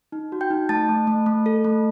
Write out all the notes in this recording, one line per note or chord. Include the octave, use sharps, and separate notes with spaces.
D#4
F#4
G5 G6
D#4
A3 A5 A6
A3
A3
A3
A4
A3